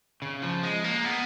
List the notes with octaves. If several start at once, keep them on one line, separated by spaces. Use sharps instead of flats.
C#3
F3
G#3
A#3
B3